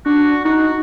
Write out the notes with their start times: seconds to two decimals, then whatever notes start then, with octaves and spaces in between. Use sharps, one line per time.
0.06 D4 F#4
0.45 D#4 F#4